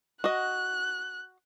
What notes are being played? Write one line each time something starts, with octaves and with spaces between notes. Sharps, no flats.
F#4 D#5 F#6